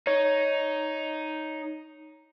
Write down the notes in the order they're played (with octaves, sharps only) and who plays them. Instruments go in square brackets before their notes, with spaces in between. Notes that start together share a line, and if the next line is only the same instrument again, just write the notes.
[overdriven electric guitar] D#4 [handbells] C#5